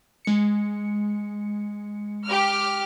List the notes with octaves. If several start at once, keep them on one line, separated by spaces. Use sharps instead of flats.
G#3 C#7
G4 F6